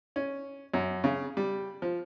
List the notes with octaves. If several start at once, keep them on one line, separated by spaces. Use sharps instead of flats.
C#4
F#2
C#3
G3
F3